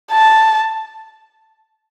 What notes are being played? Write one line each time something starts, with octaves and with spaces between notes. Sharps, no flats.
A5